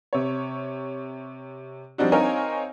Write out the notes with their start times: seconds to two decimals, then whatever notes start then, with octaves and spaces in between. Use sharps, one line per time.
0.13 C3 C#5
1.98 F3 G3 C4 D4 D#4 F#4
2.12 C4 D#4 A#4 C#5 F5 G#5